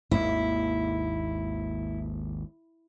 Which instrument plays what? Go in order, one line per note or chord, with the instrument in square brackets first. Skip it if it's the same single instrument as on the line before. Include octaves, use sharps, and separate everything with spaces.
[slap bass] G#1 D#2 A#3 [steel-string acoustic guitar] E4